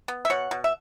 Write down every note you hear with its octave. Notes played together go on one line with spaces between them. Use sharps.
B3
E5
B2 C#5 F#5
B2
E5